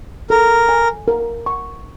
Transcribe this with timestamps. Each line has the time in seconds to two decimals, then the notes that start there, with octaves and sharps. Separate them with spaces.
0.30 A4 A#4
0.69 G#5
1.08 A#4
1.46 C#6